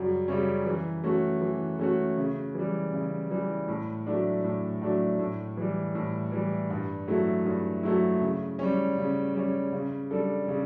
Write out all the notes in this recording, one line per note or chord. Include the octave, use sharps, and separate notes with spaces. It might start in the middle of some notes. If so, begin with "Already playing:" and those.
Already playing: F#2 C#3 G3 C#4
C#3 G3 C#4
E3
A3 C#4 F#4
E3
A3 C#4 F#4
C#3
E3 G3
C#3
E3 G3
A2
F#3 A3 D4
A2
F#3 A3 D4
A2
E3 G3
A2
E3 G3
G2
F#3 A3 E4
G2
F#3 A3 E4
C#3
G3 C#4
C#3
G3 C#4
C#3
G3 D4 A4
C#3